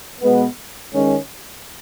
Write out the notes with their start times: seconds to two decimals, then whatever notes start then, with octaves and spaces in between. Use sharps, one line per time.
0.21 B2 G#3 B3
0.92 D#3 G#3 C#4